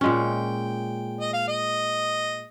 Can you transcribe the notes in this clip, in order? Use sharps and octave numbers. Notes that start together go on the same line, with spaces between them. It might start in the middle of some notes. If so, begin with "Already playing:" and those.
A#2 G#3 C#4 G5
D#5
F5
D#5